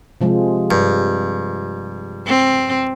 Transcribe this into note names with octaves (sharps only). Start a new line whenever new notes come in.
C3 F3 G#3
G2
C4